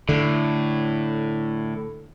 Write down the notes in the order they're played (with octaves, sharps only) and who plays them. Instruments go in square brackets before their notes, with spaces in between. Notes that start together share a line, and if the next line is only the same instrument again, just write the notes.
[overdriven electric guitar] A2 [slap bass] D3